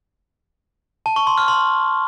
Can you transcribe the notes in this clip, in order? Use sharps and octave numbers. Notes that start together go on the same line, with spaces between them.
A5
C#6
C6
F6
C6